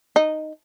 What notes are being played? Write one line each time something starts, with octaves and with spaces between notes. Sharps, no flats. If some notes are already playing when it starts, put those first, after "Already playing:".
D#4